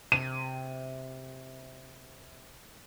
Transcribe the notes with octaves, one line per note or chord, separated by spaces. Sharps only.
C3 D#7